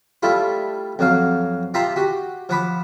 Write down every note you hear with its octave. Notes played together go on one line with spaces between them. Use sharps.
G3 A3 E4 F4
F2 F#3 F5
F4 G4 E5 A5 A#5 C6
F#4 G4
F3 F#5 B5 D6